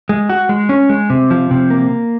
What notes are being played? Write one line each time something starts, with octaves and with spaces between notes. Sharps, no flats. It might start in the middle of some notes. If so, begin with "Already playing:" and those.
G#3
F#4
G#3
C#4
G#3
C3
F3
C3
A#3